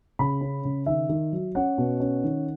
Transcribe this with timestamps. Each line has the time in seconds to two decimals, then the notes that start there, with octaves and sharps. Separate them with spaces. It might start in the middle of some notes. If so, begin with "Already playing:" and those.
0.19 C#3 B5
0.41 C#4
0.65 C#3
0.86 D#3 E5
1.09 D#3
1.33 F#3
1.55 C#4 F#5
1.78 B2
2.00 C#4
2.24 D#3